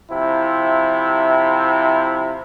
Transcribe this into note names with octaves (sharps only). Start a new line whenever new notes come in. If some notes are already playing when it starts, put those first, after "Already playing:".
C3 F3 E4